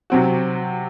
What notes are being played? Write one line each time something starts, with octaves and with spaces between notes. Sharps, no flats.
C3 F#3 C4 F#4